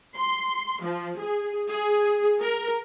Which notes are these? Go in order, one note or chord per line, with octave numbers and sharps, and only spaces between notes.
C6
F3
G#4
G#4
A#4